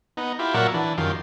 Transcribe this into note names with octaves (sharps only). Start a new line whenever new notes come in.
B3 D#4
E4 F4 G4
A#2 F#3 A#4 D5 E5 F#5
E3 D4
F#2 D#3 F4 G4 C6